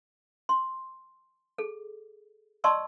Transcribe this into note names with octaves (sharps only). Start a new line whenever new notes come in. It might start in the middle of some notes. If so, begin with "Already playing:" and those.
C6
G#4 A4
D5 D#5 A5 C6 C#6 E6